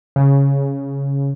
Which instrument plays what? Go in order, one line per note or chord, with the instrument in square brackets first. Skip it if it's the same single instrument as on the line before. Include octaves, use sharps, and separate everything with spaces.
[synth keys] C#3